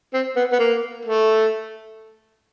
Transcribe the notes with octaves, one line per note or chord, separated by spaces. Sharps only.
C4
B3
B3
A#3
A3